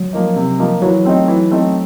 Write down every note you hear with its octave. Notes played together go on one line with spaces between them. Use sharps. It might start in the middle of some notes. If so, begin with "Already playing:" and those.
Already playing: F#3
F3 A#3 D#4
C3
F3 A#3 D#4
E3 F#3
A3 C4 D#4
E3
A3 C4 D#4